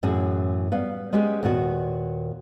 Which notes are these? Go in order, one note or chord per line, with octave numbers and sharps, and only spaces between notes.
F#2 A2 E3 C#4 F#4 G#4
G3 B3 F5
G#3 B3 C#4 G4 G#4
D#2 A#2 B3 F#4